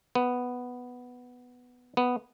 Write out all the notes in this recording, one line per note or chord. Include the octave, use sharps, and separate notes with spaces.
B3
B3